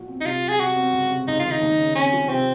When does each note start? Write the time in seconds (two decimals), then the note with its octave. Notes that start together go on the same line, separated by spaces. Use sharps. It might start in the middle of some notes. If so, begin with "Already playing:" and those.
Already playing: A#2 F3 F#4
0.08 C4
0.20 D#4
0.24 C3 F4
0.42 F#3
0.48 G#4
0.59 C3 F#4
0.76 C4
0.93 C#2
1.11 C3
1.28 C#2 D#4
1.40 F4
1.45 D#3
1.51 D#4
1.61 D#2
1.79 C#3
1.95 C4 C#4
2.13 F3
2.29 C3 C4